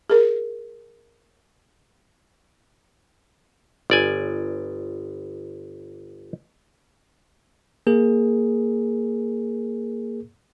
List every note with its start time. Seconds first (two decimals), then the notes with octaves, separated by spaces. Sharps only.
0.10 G#4 A#4
3.90 G1 D5 G#5
7.87 A#3 G#4 A#4